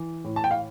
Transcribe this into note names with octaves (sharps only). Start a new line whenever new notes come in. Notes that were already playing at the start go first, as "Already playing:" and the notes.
Already playing: E3
A2
A5
G5
F5